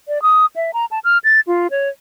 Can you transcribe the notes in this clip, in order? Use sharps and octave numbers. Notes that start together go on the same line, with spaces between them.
D5
D#6
E5
A#5
A5
F6
A6
F4
C#5